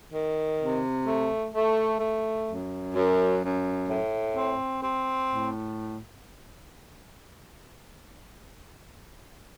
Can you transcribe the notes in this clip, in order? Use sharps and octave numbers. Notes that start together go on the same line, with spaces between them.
D#3
C3
A3
A3
A3
F#2
F#2
F#2
A2
C4
C4
A2